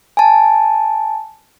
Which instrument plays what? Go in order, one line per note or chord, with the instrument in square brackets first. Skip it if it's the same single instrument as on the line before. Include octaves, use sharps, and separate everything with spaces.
[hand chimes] G#5 A5